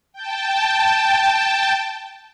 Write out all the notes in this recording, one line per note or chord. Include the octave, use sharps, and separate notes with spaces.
G5 A5